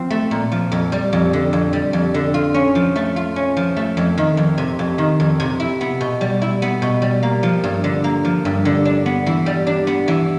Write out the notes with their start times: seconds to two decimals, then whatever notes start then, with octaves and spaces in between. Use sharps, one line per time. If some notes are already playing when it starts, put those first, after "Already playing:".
Already playing: F3 C4
0.11 A3
0.31 A#2
0.52 F3
0.72 F2
0.92 G3
1.13 F2
1.33 D3
1.53 F2
1.73 G3
1.93 F2
2.14 D3
2.34 F4
2.54 C#4
2.75 F3
2.96 A3
3.16 F4
3.36 C#4
3.57 F3
3.77 A3
3.97 F2
4.18 D#3
4.37 F2
4.58 C3
4.79 F2
4.98 D#3
5.20 F2
5.40 C3
5.60 E4
5.81 B3
6.01 B2
6.21 G3
6.42 E4
6.62 B3
6.82 B2
7.02 G3
7.23 A#3
7.43 F3
7.64 G2
7.84 D3
8.04 A#3
8.25 F3
8.45 G2
8.65 D3
8.85 D4
9.06 B3
9.26 E3
9.46 G3
9.67 D4
9.87 B3
10.08 E3